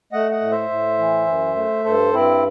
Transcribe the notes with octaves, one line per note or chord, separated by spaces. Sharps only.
A3 D#5 F#5
D#5 F#5
A2
C5 E5
A2
E3
F#2
A3
G2 A4 C5
G2 C4 E4